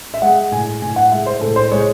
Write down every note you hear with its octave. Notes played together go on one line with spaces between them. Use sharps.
E5
G#3 F#5
A2 G#5
A2 G#5
F#5
G#3 E5
C5
A2 A4
C5
G#3 C#5